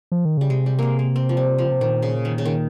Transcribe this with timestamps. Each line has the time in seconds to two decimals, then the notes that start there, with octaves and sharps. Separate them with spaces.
0.12 F3
0.25 D#3
0.37 C#3 G3
0.50 C3 G#3
0.66 G3
0.79 G#3 A#3
0.99 A#3
1.16 C4
1.29 F3
1.37 G3
1.58 F3
1.64 C#3
1.72 C3
1.80 A#2 D#3
2.02 C#3
2.25 D#3
2.38 C#3
2.45 D#3